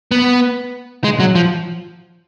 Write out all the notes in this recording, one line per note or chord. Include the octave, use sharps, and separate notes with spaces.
B3
G#3
F#3
F3